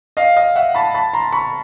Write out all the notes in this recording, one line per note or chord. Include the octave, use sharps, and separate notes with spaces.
D#5 F5
D#5 F5
E5 F#5
A5 B5
A5 B5
A#5 C6
B5 C#6